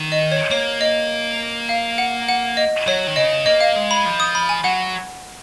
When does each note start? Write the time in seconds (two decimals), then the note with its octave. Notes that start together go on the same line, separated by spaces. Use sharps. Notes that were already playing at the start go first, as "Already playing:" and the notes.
Already playing: D#3
0.12 D#5
0.32 C#5
0.51 A#3 C#5
0.81 D#5
1.69 F5
1.98 F#5
2.29 F#5
2.57 D#5
2.87 F#3 C#5
3.07 D#3
3.16 C#3 D#5
3.46 A#3 D#5
3.61 F5
3.76 G#3
3.91 B5
4.05 F3
4.20 D#6
4.35 B5
4.49 G#5
4.64 F#3 F#5